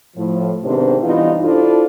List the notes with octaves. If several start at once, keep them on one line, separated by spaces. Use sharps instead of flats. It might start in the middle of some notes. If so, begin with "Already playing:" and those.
A2 F3
G#2 C3 D#3 B3 D4 C5
G2 E3 G3 B3 D#4 F4
D4 E4 F4 A4 C5